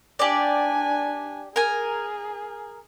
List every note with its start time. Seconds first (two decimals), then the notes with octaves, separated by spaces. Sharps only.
0.19 D4 G4 D5 G#5
1.56 G#4 A#4 G#5